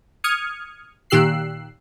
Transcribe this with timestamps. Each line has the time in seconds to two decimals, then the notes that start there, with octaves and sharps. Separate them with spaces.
0.24 D#6 F6 G#6 C#7
1.10 A#2 D#3 G4 E6 F#6 C7